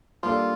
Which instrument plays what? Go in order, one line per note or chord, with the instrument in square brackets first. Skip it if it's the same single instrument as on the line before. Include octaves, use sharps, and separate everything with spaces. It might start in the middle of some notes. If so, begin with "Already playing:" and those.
[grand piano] G3 A#3 D4 A4 D5 [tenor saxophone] F4